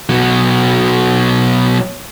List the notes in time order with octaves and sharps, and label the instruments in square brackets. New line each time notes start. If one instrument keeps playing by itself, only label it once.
[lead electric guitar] B2 F#3